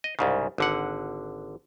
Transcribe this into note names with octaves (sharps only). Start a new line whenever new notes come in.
D#5
C2 G#2 C#3
G#1 D3 F#5